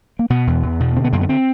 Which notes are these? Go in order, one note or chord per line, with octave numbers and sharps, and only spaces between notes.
A#3
B2 B3
E2
E2
B2
D3 C4
B3
F#2 A#3
B3
C4